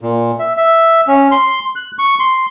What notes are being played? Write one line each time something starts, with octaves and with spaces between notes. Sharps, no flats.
A#2
E5
E5
C#4
C6
F#6
C#6
C6